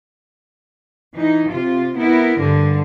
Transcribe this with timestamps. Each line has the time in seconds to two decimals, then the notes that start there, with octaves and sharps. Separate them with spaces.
1.15 E3 D#4
1.50 C3 F4
1.97 B3 E4 A#4
2.40 G2 D3